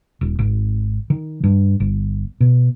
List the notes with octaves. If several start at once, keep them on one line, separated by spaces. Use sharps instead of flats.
D#1
G#1
D#3
G2
G1
B2